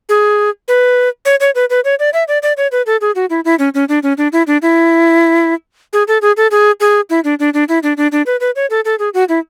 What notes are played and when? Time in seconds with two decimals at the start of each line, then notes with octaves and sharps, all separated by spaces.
0.09 G#4
0.68 B4
1.25 C#5
1.40 C#5
1.55 B4
1.70 B4
1.85 C#5
1.99 D5
2.14 E5
2.28 D5
2.43 D5
2.57 C#5
2.72 B4
2.86 A4
3.01 G#4
3.15 F#4
3.30 E4
3.45 E4
3.59 C#4
3.74 C#4
3.89 D4
4.03 C#4
4.18 D4
4.33 E4
4.47 D4
4.62 E4
5.93 G#4
6.08 A4
6.22 G#4
6.37 A4
6.51 G#4
6.80 G#4
7.10 E4
7.24 D4
7.40 D4
7.54 D4
7.69 E4
7.83 D4
7.97 D4
8.12 D4
8.26 B4
8.40 B4
8.56 C#5
8.70 A4
8.85 A4
8.99 G#4
9.14 F#4
9.29 E4